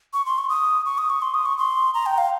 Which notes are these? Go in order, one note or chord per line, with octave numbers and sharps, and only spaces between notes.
C#6
C6
C#6
D#6
C#6
D#6
C#6
C6
D#6
C#6
C6
A#5
G5
F5